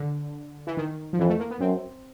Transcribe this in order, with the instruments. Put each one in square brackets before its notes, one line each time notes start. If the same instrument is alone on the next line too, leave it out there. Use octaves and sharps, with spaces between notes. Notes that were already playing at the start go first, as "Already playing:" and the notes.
Already playing: [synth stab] D3
E3
D#3
F3
[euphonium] F2 [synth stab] E3
[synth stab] A3
A#3
B3
[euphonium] F#2 [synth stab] C4